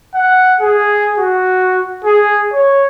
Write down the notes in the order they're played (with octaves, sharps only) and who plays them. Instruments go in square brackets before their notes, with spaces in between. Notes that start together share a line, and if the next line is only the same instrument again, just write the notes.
[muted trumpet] F#5
G#4
F#4
G#4
C#5